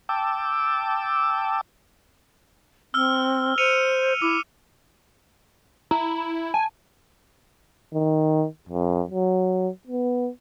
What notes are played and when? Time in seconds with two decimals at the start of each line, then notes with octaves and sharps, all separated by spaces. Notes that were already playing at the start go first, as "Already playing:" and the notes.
0.09 G5 A5 D6 E6
2.94 C4 E6 F6 G7
3.58 C5 C#7 D#7 F7
4.22 E4 D6
5.91 E4 A#5
6.54 G#5 A5
7.93 D#3
8.69 F2
9.10 F#3
9.87 B3